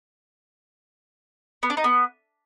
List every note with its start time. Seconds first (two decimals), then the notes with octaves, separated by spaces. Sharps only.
1.63 B3
1.70 D4
1.77 D#4
1.84 B3